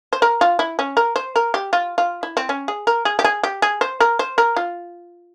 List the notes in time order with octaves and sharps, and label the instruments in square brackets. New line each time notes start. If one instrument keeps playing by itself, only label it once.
[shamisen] C5
A#4
F4
E4
C#4
A#4
C5
A#4
G4
F4
F4
E4
C4
C#4
G#4
A#4
G#4
G4
G#4
G4
G#4
C5
A#4
C5
A#4
F4